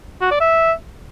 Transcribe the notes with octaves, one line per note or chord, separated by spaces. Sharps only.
F#4
D5
E5